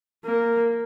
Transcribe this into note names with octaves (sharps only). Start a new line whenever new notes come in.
A#3